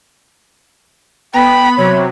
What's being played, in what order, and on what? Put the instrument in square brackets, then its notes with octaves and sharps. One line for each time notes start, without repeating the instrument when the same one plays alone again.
[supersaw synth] B3 [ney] G5 [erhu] B5
[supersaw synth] C3 F#3 [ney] C#5